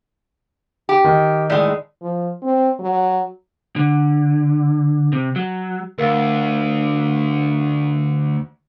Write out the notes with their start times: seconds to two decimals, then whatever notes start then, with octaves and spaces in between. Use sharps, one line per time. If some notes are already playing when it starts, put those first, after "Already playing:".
0.89 G4
1.04 D#3
1.50 A2 G#3 D5
2.02 F3
2.42 C4
2.79 F#3
3.76 D3
5.13 C3
5.36 F#3
5.98 D2 A#4 F5 E6